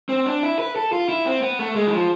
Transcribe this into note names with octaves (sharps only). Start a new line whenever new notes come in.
C4
D4
E4
B4
A4
F4
E4
C4
B3
A3
G#3
E3
F3